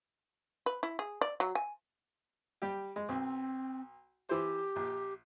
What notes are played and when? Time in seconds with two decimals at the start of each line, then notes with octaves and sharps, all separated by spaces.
0.66 B4
0.83 E4
0.99 G#4
1.21 D5
1.40 F#3
1.55 G#5
2.62 G3 G4
2.96 G#3
3.09 B1 C4
4.29 E3 G4 C5
4.76 A#1